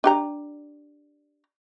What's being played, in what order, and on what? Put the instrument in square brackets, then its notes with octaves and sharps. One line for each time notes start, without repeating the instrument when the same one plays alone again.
[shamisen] D4 G4 A#5